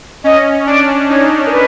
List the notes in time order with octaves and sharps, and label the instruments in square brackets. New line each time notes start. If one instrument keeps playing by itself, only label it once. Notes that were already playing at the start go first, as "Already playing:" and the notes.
[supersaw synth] C#4 [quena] D#5
[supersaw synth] D4 [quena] D5
[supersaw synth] D#4 [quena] C#5
[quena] A#4
B4